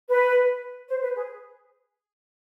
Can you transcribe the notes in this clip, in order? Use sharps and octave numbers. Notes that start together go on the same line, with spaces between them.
B4
C5
B4
G#4